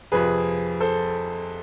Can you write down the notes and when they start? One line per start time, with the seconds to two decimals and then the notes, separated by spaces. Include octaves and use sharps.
0.12 F2 C3 F3 G#4 B4
0.80 A4 C5